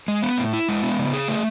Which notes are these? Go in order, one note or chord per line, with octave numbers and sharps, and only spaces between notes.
G#3
B3
A2
E4
G#3
B3
C#3
G#4
A3